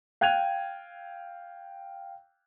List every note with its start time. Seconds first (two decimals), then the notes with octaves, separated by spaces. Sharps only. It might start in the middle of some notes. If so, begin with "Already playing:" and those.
0.21 F5 G5 F#6 G#6 D#7 F7